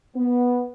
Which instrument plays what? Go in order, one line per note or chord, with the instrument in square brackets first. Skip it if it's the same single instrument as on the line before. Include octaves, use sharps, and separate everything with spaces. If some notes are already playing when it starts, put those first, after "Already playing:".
[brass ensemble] B3